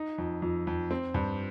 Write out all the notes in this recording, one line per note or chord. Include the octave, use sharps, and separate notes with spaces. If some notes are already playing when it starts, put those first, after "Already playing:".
Already playing: D#4
F2
F2
F2
C4
G2